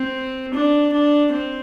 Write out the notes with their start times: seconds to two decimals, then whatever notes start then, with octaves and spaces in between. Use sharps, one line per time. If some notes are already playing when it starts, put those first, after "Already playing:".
Already playing: C4
0.54 D4
0.93 D4
1.32 C4